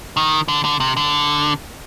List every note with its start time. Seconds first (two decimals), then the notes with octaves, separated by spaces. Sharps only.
0.17 D#3
0.48 D3
0.65 D3
0.80 C3
0.97 D3